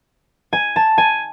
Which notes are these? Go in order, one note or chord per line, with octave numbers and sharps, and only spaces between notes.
G#5
A5
G#5